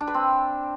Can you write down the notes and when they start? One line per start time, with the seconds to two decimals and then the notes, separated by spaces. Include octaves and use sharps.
0.01 D4
0.07 B4
0.14 C4